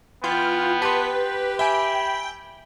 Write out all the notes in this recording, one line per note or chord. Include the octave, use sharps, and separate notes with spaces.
E3 B3 F4 G5
G4 B4 A5 C6
E5 G5 G#5 B5